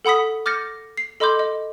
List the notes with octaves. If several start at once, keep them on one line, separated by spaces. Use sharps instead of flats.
A4 F#5 B5 D#6 B6
D6 F6 G6 A6 A#6 C#7
C7
A4 D#5 B5 C6 D6 G6
D#5